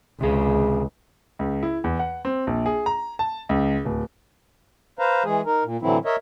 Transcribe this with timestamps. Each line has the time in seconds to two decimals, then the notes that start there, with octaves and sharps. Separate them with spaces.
0.21 C#2 C3 G#4
1.39 C#2
1.63 E4
1.84 E2
1.99 F#5
2.25 C4
2.47 A#1
2.66 G#4
2.86 A#5
3.19 A5
3.49 C#2
3.85 D1
4.99 B4 C5 F5 A#5
5.25 E3 G#3 G#4
5.46 D#4 A#4
5.64 A#2
5.82 A2 D3 E3 F#3 C4 E4
6.05 A#4 C#5 D#5 E5